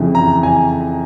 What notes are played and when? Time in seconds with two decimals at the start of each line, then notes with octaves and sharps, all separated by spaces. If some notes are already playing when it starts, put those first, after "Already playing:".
Already playing: F2 C#3 E3
0.15 A#5
0.43 G#5